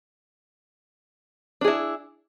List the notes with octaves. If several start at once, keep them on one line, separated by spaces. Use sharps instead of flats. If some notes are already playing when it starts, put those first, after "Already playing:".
D4 E4 G#4